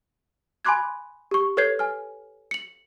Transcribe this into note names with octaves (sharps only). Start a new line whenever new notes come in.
G#5 B5 C6 D6 F#6 G#6
G4 C#6
A4 B4 C#5 G6 G#6 C7
G#5 F6
C#7 F#7